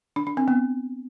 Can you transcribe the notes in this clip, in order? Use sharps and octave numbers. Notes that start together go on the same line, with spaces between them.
D4
D4
C4
B3